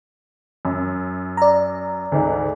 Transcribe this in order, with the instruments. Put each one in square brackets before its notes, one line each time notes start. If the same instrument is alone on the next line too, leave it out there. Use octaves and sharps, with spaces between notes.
[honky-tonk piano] F#2
[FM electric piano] D5 A#5
[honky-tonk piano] D2 G#2